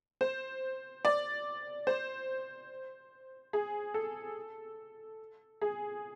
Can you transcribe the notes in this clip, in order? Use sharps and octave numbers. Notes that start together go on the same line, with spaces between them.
C5
D5
C5
G#4
A4
G#4